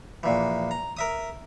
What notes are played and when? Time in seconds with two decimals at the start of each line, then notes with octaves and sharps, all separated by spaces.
0.23 A#1 A#2 E3
0.71 A#5
0.97 A#4 E5 D#6